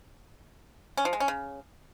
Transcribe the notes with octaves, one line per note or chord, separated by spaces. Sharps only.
C#4
F3
G#3
C#4
C#3